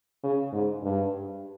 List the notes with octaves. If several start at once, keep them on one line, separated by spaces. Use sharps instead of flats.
C#3
G#2
G2